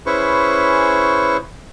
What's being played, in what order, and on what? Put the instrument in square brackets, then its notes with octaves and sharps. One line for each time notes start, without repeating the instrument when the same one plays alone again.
[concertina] C#4 E4 G#4 B4 C5 C#6